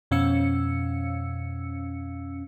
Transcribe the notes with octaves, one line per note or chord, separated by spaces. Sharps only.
F2 B2 C#4 F5 E6 C#7